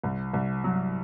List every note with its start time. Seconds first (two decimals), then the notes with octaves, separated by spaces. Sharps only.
0.03 C2
0.33 C2
0.64 F#3